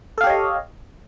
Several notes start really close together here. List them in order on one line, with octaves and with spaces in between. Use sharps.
A4 F5 G4 C#5 D#5